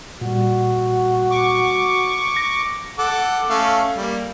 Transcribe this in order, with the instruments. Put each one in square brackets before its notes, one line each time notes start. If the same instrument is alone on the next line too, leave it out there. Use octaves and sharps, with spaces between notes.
[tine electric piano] A#2 G3 [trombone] F#4
[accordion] C#6 D6
[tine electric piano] A#6
[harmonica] A4 F#5 D6
A3 C#4 F5
G3 A#3